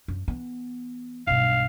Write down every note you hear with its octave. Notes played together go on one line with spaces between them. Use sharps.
F#2
E3 B3
B1 G2 F5